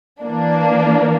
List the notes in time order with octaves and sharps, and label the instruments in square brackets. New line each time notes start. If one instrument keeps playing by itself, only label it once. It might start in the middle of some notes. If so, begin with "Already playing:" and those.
[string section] E3 A#3 D4